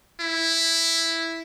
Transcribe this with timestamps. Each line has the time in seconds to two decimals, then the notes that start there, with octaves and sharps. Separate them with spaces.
0.20 E4